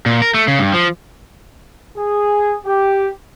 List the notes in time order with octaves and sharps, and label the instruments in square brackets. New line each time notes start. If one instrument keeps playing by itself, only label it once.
[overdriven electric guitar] A#2
A#4
A3
C#3
G2
F3
[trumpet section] G#4
G4